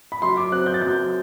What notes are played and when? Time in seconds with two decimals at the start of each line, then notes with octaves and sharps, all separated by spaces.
0.12 B5
0.22 F#2 C6
0.37 D6
0.52 F#3 C4 F#6
0.66 G6
0.74 A6
0.82 F#2 G6